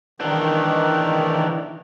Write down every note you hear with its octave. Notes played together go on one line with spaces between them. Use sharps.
D#3 E3 D4